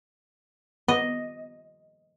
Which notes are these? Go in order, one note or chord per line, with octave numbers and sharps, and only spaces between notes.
B3 D#5